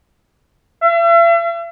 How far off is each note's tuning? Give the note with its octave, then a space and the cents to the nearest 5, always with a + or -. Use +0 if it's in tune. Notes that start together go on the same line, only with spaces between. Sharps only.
E5 +45